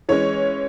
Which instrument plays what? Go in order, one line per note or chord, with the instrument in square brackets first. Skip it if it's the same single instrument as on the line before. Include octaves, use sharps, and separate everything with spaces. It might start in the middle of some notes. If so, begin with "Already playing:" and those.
[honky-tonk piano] E3 G#3 C#4 C#5